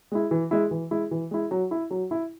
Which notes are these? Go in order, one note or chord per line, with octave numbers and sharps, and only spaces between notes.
G#3 E4
E3
G#3 E4
E3
G#3 E4
E3
G#3 E4
F#3
E4
F#3
E4